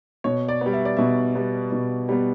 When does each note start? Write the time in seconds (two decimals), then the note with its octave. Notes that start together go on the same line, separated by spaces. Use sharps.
0.24 B2 C#5
0.49 D5
0.61 B3
0.66 G3
0.73 E5
0.85 D5
0.97 B2 E5
1.35 G3 B3
1.72 B2
2.09 G3 B3